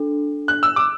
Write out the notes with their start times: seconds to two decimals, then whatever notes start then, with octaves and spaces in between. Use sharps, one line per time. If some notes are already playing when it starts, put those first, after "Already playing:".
Already playing: D4 A4
0.48 F#6
0.63 E6
0.76 D6